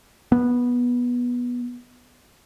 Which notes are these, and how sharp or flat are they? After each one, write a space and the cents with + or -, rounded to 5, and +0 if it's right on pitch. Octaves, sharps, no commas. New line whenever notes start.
B3 -15